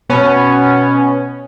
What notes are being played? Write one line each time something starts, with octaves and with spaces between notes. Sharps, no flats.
B2 B3 C#4